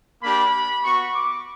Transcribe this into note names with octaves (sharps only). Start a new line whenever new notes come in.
A#3 D4 G4 B5
B3 F#4 C#6
D6